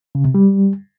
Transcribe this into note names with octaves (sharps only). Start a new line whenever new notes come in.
C#3
C3
G3